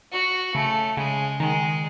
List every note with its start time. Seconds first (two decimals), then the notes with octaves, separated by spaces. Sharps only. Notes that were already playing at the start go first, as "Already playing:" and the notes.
0.12 F#4
0.55 C#3 A3
0.97 C#3 G#3
1.40 D#3 G#3